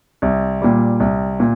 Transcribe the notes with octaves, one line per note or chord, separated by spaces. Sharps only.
C2
A#2 G3
C2
A#2